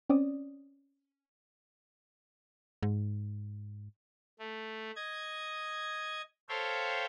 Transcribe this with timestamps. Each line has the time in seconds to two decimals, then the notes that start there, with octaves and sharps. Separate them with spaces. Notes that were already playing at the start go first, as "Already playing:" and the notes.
0.10 C4 C#4 D5 D#6
2.83 G#2
4.39 A3
4.96 D#5 G#6
6.49 A4 C5 C#5 E5 F5 G5